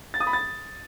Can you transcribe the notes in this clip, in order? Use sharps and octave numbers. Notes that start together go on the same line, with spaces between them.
A6
D#6
B5
A6